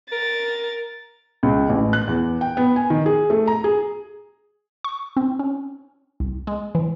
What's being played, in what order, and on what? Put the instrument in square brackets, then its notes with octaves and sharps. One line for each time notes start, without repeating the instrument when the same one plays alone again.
[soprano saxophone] A#4 [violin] A6
[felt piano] C#2
A1
F#6
E2
G5
B3
G#5
D#3
G#4
A3
A#5
G#4
[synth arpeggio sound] C#6
C4
C#4
C2
G#3
E3